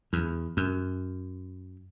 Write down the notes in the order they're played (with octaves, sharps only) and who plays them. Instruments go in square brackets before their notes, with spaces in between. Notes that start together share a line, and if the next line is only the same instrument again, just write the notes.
[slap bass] E2
F#2